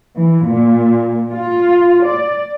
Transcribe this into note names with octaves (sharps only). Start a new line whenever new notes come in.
E3
A#2
F4
D5